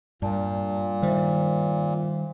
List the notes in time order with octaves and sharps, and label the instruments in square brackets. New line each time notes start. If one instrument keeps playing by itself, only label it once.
[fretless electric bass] G2 [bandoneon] A#2 [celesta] D5 A5
[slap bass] D#3 G3 [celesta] C5 E5